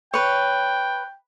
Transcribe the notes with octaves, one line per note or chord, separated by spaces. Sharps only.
B4 C#5 G5